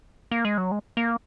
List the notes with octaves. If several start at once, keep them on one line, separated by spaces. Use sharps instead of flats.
A#3
G#3
F#3
G#3
A#3